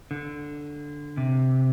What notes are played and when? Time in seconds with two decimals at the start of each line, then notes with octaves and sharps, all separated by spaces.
0.11 D3
1.17 C3